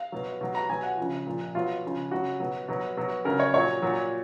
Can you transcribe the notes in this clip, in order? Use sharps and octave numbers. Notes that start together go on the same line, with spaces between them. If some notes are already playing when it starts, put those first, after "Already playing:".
Already playing: F5
B2 F#3
B2 F#3
A#5
B2 F#3 G#5
F#5
C#3 F3
A#2 F3
B2 F#3 F4
C#3 F3
C#3 F#3 F#4
B2 F#3
B2 F#3
B2 F#3
C#3 F#3 A#4
C#5
A#2 F#3 C#5
A#2 F#3